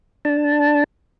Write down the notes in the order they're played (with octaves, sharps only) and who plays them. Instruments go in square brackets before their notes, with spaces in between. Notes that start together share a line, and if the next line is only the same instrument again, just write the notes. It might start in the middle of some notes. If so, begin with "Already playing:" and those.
[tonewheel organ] D4 A5